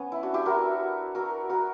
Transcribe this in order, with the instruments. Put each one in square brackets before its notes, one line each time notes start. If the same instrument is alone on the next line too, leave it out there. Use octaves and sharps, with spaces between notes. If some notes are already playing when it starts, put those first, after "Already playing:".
Already playing: [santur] B3 C#4
E4
D4 F#4
E4 G4
F#4 A#4
F#4 A#4
F#4 A#4